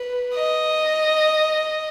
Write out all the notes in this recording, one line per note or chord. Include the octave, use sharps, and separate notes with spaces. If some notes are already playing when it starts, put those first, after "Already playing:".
Already playing: B4
D#5